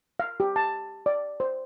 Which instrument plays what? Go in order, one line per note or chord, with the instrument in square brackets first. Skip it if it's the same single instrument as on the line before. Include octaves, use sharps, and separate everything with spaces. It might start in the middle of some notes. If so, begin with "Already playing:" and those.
[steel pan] F5
G4
A5
D5
C5